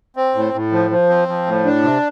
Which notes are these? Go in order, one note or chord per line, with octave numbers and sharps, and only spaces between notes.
C4
A2
A2
F3
F3
C4
F3
A2
D4
C3